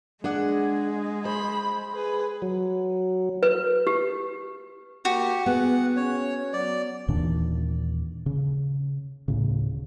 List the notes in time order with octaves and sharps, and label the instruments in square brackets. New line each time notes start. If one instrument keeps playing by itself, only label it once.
[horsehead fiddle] G#3 [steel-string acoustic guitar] D4 G#4 F#5
[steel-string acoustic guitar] C5 [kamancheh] B5
[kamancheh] G#4 B4
[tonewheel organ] F#3
[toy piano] B4
G4
[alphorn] A#3 [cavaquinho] F#4 [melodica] G4
[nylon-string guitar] B3 [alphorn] G#4 [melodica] F#5
[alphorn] C#4 [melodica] C#5
[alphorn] F#3 [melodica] D5
[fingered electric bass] D#2 A#2 E3 D4
C#3
D2 A2 C#3